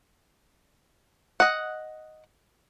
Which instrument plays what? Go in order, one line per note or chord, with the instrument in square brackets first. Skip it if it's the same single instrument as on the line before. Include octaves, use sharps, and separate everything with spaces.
[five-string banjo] D#5 F#5